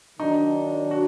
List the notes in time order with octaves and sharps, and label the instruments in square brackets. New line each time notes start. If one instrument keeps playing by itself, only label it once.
[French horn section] D#3 F#3 D4 [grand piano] D#4
[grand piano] F#4